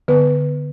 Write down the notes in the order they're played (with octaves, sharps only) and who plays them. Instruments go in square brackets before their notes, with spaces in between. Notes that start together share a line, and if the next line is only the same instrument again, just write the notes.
[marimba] D3 B3 B4